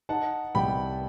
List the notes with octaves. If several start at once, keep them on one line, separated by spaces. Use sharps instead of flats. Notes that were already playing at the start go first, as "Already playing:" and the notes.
D#4 F#5 A5
C2 G5 B5